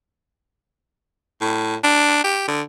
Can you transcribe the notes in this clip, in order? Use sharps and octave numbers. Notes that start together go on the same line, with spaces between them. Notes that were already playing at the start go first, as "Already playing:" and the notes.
A2
D4
G4
D3